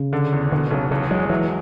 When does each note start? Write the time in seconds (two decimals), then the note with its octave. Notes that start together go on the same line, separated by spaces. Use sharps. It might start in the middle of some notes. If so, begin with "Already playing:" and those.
Already playing: C#3
0.13 D3
0.32 E2
0.51 B2 D3
0.71 B1 C#3
0.91 E2 C#3
1.11 F#3 G#3
1.30 E3 F#3